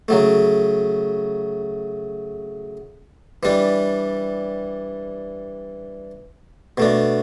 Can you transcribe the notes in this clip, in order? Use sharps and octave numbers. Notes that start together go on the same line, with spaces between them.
C#3 F#3 A3
E3 G3 D4
B2 A3 D4